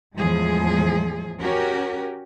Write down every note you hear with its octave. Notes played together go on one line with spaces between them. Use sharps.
E2 A2 F3 G#3 G#4
C#4 F#4 G4 A#4